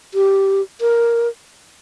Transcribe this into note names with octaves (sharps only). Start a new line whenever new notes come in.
G4
A#4